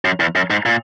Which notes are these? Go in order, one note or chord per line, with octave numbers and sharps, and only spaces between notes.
F#2
E2
F#2
G#2
A#2